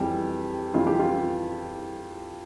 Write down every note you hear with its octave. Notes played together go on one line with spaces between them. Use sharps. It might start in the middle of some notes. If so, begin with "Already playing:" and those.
Already playing: F2 E3 G3 G4
F2 E3 G3 F4
G4
F4